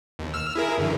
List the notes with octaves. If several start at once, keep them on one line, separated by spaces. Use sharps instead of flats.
D#2
E6 F6
E4 G#4 A#4
F#2 D3 E3